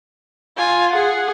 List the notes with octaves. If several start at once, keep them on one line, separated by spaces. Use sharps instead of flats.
F4 G#5
G#4 F#5